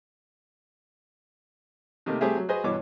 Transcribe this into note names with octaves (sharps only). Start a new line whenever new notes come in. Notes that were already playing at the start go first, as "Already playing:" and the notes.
C3 D#3 A3 A#3
G3 A3 C4 G4 G#4 E5
F#3
F#4 G#4 B4 C5 D#5
G2 B2 E3 C#5 D6